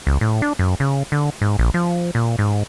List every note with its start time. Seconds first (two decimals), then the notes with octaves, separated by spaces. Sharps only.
0.07 C#2
0.21 A2
0.42 D4
0.59 F#2
0.80 C#3
1.12 D3
1.41 G#2
1.59 A#1
1.74 F3
2.15 A#2
2.39 G#2